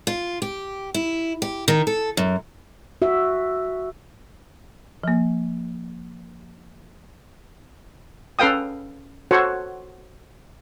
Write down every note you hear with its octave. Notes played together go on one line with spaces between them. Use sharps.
F4
G4
E4
G4
D#3
A4
F#2
F#4 E5
F3 A#3
C#4 A4 B4 F5 G5 D#6
F#4 A4 C5 C#5 F#5